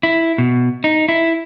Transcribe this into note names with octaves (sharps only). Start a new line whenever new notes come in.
E4
B2
D#4
E4